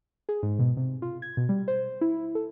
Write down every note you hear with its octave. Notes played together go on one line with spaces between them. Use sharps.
G#4
G#2
B2
C3
F4
G#6
B2
G3
C5
E4
A4